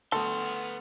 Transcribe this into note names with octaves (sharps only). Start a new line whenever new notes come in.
D2 A3 B3 A4 F#5 C6 D#6 F6